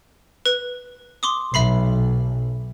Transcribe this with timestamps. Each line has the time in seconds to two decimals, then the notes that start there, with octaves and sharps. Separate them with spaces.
0.46 B4
1.23 C6 D6 D#6
1.54 B1 E5 B5 C7